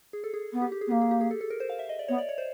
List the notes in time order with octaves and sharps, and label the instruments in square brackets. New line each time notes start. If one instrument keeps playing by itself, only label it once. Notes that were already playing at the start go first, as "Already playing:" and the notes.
[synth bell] G#4
A4
G#4
[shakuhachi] B3
[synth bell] G4
G4
G#4
[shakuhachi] B3
[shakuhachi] A#3 [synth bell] G4
[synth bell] G#4
G4
G#4
A4
A4
A#4
C5
F5
E5
D#5
D5
[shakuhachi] B3 [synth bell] C#5
[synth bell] D5
C#5
C5